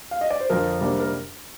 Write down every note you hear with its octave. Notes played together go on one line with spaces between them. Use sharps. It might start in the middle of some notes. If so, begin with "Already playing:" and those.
F5
D#5
D5
C5
F2 D3 F3 A#4
C3 G3 A#3 D4
A#4